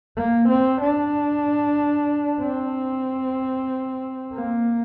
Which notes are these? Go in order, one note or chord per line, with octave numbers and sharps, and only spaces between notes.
A#3
C4
D4
C4
A#3